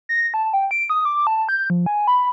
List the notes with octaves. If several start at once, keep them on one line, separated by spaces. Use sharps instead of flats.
A#6
A5
G5
D7
D#6
D6
A5
G6
F3
G#5
B5